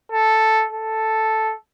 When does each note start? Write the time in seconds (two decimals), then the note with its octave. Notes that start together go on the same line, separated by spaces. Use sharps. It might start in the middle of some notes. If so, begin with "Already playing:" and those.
0.12 A4
0.73 A4